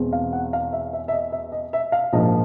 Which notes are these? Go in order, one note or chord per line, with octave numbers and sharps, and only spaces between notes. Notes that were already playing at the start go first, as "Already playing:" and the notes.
Already playing: E2 B2 G#3 C4
F5
F#5
F5
E5
E5
E5
D#5
E5
D#5
E5
F5
A#1 G#2 F3 A#3 D#5